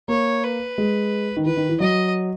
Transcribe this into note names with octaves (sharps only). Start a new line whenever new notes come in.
A#3 C#5
B4
G#3
D#3
E3 B4
D#3
E3
F#3 D#5